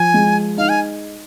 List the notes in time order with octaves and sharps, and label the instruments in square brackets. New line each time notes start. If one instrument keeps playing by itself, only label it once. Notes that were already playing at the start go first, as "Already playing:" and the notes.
Already playing: [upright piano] F3 [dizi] G#5
[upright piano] G#3
[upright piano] D#4 [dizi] F5
[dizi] G#5